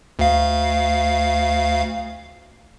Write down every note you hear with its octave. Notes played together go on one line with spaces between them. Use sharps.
D2 F5